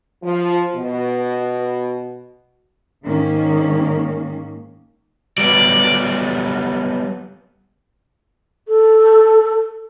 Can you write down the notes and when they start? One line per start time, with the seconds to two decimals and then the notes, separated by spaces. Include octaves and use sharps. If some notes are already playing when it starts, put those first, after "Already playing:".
0.23 F3
0.75 B2
3.05 G#2 D#3 A#3 C#4
5.38 F#3 G3 B3 D5
8.68 A4